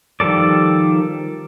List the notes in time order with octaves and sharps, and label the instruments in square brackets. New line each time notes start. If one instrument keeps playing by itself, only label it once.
[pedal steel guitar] D#3 F3 G3 A4 D5